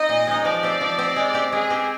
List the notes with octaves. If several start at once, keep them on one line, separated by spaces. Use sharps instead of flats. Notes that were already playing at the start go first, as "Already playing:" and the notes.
Already playing: C4 D#4 D#5
A#2
G#3 D#4
F3 D5
C4 G4
F3
C4 G4
G#3
C4 G4
G#3 G#4
C4 G4